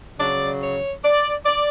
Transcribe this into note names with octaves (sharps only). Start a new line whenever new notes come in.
C#3 F#3 D5
C#5
D5
D5